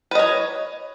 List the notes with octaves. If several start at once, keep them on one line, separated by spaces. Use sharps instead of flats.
B4 C#5 D#5